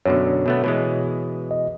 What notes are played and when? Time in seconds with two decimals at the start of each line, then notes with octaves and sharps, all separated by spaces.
0.06 F#2 B2 D3 C#5
0.46 B2 A3 B3
0.64 B2 E3 G#3
1.51 D#5